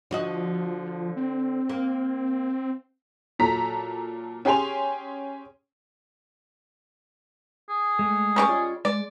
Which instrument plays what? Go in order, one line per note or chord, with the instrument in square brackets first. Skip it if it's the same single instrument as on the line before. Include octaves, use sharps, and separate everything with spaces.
[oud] D3 F#4 D#5 [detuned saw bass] F3
[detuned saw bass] C4
[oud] A#3
[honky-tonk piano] A#2 F#3 A4 A#5 B6
C#4 G4 G#4 G#5 C6 F7
[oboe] G#4
[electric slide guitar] G#3 A3
[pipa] G3 C#4 D5
[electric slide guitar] F4 C#5 D#5
[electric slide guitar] G#3 [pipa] D5